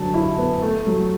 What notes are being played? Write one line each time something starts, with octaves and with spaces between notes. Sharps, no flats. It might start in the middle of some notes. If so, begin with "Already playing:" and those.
Already playing: D3 F#3 A5
E4
B3
A3
F#3